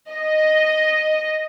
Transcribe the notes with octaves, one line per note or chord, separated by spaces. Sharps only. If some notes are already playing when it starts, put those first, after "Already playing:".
D#5